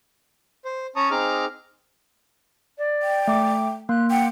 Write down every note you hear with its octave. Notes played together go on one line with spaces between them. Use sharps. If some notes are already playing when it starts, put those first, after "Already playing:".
C5
C#4 C#5 A5 A#5 C#6 D#6
C4 D#4 G#4 A#5 D6 F6
D5
G5
A3 D6
A#3 C6 F#6
F#5 G5